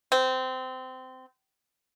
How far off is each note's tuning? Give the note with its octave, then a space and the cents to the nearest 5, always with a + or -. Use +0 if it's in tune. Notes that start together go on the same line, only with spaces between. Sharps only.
C4 -20